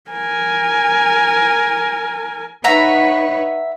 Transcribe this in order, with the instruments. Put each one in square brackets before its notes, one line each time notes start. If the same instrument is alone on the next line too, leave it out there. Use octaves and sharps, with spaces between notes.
[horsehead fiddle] A#4 G#5
[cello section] D#4 B4 C#5 [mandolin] E5 F#5 A#5